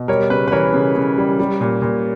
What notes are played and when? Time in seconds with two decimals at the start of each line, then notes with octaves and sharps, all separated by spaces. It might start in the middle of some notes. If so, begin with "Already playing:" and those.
Already playing: B2
0.08 G3 A#4 C#5
0.30 C#3 B4
0.48 B4
0.52 E3 A#4 C#5
0.73 C#3
0.95 C#3
1.18 G3
1.39 G3
1.61 A#2
1.82 A#2